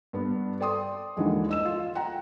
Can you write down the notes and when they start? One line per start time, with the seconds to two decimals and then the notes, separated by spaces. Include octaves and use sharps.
0.13 G2 B3
0.60 A4 D5 G5 C6 D#6
1.17 D#2 D3 E3 F3 G#3
1.49 D#5 E6 E7
1.65 F4
1.95 F#5 G5 A#5